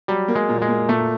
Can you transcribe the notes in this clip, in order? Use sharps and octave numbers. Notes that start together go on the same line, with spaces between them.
F#3 G3
A#3
G#3
A#2
G#3
A#3
A#2 A3